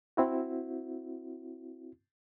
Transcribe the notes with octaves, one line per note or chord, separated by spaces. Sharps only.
C4 E4 F#4